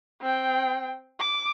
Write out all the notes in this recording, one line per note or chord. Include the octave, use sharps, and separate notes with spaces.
C4 G5
D6